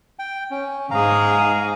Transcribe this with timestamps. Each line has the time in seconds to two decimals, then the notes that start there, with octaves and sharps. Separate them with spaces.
0.19 G5
0.51 C#4
0.91 G#2 G#4 F5 A#5